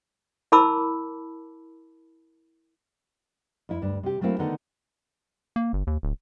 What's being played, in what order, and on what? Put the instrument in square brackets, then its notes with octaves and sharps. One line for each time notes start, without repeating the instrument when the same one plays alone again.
[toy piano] E4 A#4 A5 B5 D6 E6
[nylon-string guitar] F2 E4
D2 G2 D4
C3 G4
F#3 A3 A#3 C4 E4 F5
D3 D#3 B3 D#4 A4
[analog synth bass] A#3
G1
D#2
D1